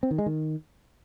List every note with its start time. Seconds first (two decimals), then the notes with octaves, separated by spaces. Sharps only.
0.03 C4
0.11 D#3
0.18 G#3
0.26 D#3